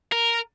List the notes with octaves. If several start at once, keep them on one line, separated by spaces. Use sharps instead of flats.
A#4